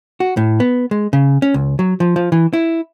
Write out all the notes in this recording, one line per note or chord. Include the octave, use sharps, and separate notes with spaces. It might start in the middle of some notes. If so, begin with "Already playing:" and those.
F#4
A2
B3
G#3
C#3
C#4
C#2
F#3
F3
F3
E3
E4